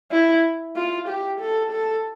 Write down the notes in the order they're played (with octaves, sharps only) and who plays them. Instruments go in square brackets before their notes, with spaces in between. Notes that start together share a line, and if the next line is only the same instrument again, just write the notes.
[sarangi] E4
F4
G4
A4
A4